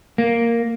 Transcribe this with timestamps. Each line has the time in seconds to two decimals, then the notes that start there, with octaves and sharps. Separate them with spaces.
0.18 A#3